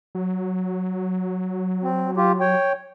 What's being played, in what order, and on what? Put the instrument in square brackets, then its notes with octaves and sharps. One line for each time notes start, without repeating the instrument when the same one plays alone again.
[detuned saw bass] F#3
[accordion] C4
F4 G4
C#5 G5